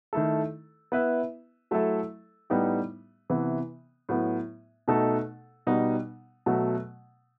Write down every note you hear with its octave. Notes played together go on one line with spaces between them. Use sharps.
D#3 A3 E4 A4
B3 E4 B4 E5
F#3 A3 E4 A4 E5
A2 G3 B3 D#4 G4
C3 E3 B3
A2 F#3 B3
B2 A3 D#4 A4
B2 G3 B3 D#4
B2 F#3 A3